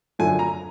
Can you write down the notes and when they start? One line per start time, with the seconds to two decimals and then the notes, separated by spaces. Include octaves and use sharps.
0.19 F#2 D3 F3 A3 G#5
0.39 A#5